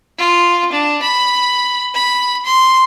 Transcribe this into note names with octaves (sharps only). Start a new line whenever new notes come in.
F4
D4
B5
B5
C6